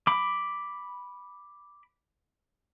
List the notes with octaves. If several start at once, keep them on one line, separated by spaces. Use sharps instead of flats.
B5 D6